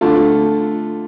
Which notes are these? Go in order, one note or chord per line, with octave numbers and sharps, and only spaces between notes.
D3 A3 F4